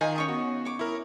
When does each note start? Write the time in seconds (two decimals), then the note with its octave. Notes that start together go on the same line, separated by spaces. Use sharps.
0.01 D#3 D#4 F4 G#5
0.16 C#4 C#5 G#5 C#6 D#6
0.28 B3 F#4
0.65 C#5 D6
0.79 E4 A#4 G#5 C#6 D#6